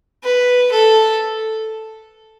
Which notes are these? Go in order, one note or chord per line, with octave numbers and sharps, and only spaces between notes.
B4
A4